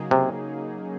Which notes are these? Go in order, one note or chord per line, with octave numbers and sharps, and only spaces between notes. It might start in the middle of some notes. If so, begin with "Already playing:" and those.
Already playing: C#3 F#3 A#3 D#4 G#4
C3